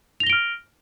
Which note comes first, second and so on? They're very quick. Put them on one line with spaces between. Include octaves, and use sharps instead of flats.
F7 A#6 G7 D7 F6